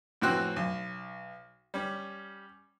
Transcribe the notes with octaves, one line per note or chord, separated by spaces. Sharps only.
F2 A2 E3 C4 F#4 F#6
B1
G3 C#4